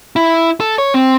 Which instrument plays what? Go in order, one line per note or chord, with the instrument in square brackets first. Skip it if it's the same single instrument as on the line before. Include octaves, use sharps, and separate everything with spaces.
[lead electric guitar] E4
A4
C#5
C4